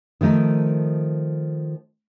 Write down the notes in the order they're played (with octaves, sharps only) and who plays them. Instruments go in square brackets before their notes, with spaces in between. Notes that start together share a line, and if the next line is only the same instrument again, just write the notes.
[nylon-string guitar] D#3 F3 A3 D#4